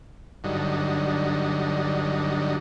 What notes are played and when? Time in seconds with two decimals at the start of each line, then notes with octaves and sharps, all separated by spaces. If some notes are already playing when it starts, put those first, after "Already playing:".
0.44 G2 D3 F#3 D#4